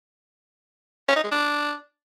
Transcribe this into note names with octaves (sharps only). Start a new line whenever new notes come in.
C#4
D#4
G#3
D4